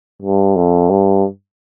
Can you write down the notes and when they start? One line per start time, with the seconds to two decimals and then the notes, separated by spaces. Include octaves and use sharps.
0.22 G2
0.56 F2
0.90 G2